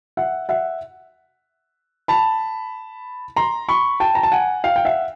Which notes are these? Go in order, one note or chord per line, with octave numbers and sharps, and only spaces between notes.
E5 F#5
E5 F#5
A5 B5
A#5 C6
B5 C#6
G5 A5
A#5
A5
F#5 G#5
F5 G5
G5
E5 F#5